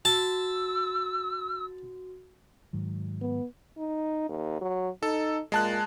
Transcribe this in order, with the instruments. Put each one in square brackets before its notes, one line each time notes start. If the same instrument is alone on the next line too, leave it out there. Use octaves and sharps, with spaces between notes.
[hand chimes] F#4 [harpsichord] A5 [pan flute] E6
[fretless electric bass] G#2 D#3 F#3
[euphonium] B3
[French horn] D#4
D#2
F#3
[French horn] D#4 [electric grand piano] A4
[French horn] A#2 [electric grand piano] G#3 A5 F#6